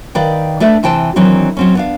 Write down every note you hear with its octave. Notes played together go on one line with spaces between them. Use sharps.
D#3 B4 D5 F5 G5
A3 D4 B4 D5 E5
C3 E3 C5 G5 A5
D#3 E3 F#3 C4 D4
F#3 C4 C#4
B3 D4 F5